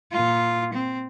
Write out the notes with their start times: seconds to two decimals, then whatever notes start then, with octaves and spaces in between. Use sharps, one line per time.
0.11 A#2 F4
0.73 C4